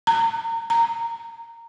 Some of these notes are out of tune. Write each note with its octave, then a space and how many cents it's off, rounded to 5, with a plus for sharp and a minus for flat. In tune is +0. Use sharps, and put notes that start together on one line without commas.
A#5 -30
A#5 -15